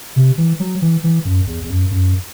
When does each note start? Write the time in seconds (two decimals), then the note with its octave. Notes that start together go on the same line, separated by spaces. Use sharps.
0.16 C3
0.38 E3
0.60 F#3
0.82 E3
1.04 E3
1.25 F#2
1.47 E2
1.64 E2
1.70 F#2
1.91 F#2